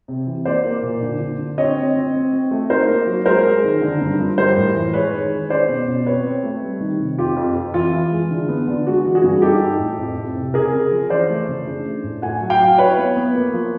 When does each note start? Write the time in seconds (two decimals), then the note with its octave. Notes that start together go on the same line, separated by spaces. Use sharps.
0.08 C3
0.27 E3
0.45 A#3 C5 D5
0.65 A#3
0.83 A#2
1.02 D3
1.20 D3
1.39 D3
1.58 C4 C#5 D#5
1.76 C4
1.96 C4
2.14 C4
2.33 C4
2.51 A3
2.69 D#4 A#4 C5
2.88 A#3
3.07 F#3
3.26 G#3 A#4 C5
3.45 G#3
3.64 D#3
3.82 D3
4.01 G2
4.19 F3
4.38 G3 A#4 C5
4.57 A2
4.75 E3
4.94 G#3 B4 C#5
5.13 D#3
5.31 G#3
5.50 C#4 C5 D5
5.69 B2
5.88 B2
6.06 C4 B4 C#5
6.24 C4
6.43 A3
6.62 G3
6.80 D#3
7.00 C3
7.18 F2 F4 G4
7.37 F2
7.55 F2
7.74 E3 F4
7.94 E3
8.11 G#3
8.31 D3
8.48 B3
8.68 D3
8.87 G#3 F#4
9.06 E3
9.15 F#4 G#4
9.24 G2
9.42 D#4 G4 A4
9.61 D#4
9.79 A2
9.99 F2
10.18 F2
10.36 C3
10.54 C#3 G#4 A#4
10.73 C#3
10.91 F3
11.10 E3 C5 D5
11.30 A3
11.48 C#3
11.67 D4
11.85 A3
12.03 A2
12.22 A3 F#5 G#5
12.41 F#3
12.50 F5 G5
12.60 F#3
12.78 E4 B4 C#5
12.98 B3
13.17 B3
13.35 A#3
13.54 F3